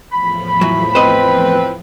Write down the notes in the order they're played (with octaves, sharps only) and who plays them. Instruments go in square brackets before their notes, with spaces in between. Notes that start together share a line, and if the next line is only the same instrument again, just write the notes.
[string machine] E2 A2 F3 [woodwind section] B5
[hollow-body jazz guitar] E3 F#3
[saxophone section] C4 B4 [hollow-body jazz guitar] C5 D#5